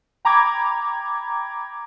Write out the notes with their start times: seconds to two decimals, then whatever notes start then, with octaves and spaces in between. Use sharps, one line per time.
0.25 G5 A#5 B5 D6 G#6